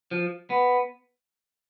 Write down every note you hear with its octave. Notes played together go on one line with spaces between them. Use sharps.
F3
B3